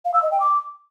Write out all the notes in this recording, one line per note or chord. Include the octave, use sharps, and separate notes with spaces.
F5
E6
D#5
G5
D6